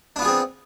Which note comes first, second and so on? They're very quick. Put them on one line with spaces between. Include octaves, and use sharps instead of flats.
D4 B3 F4 G#4 C4